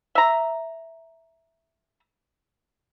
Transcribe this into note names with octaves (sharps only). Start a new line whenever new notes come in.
E5 A#5